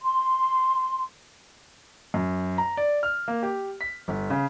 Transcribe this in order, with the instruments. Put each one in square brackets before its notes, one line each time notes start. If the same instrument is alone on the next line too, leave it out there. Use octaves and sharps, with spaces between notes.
[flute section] C6
[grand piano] F#2
A#5
D5
F6
A#3
G4
B6
G1
C#3